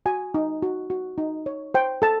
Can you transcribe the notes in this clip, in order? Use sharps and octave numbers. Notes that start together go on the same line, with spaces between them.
F#4 G#5
D#4
F#4
F#4
D#4
C#5
C5 G5
A4 A5